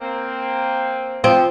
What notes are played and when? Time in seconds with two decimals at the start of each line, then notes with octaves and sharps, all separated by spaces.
0.02 A#3 C4
1.24 F3 C4